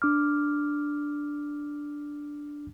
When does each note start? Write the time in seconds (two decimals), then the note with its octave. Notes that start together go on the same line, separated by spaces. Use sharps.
0.02 D4 D6 F6